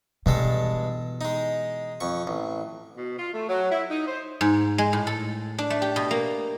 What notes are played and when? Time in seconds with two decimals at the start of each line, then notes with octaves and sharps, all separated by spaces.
0.26 G2 B2 E3 G#3 A4
1.21 G#3 D#4
2.00 F2 C#6
2.27 A1
2.97 B2
3.17 F4
3.33 A3
3.48 F#3
3.70 E4
3.90 D#4
4.07 C5
4.41 G#2
4.78 G#3
4.93 A2
5.07 A4
5.58 D4
5.70 A3
5.82 G4
5.96 B2
6.11 A#3